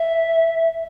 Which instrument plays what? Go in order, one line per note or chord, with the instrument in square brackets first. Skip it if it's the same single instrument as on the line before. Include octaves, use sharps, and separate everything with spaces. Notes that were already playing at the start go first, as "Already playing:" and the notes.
Already playing: [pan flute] E5